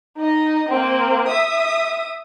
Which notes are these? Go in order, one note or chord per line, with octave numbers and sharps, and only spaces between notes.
D#4 D#5
A#3 C4
E5 D#6